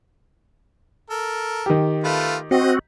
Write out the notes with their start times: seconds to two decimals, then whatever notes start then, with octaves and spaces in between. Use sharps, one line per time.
1.10 A4 A#4
1.66 D#3 G4
2.04 A3 F4 B4
2.51 C4 F#4 D#5